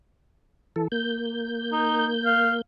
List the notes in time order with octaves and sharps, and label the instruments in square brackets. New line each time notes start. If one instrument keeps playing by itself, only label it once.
[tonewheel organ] E3 A4
A#3 G6
[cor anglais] D#4
F5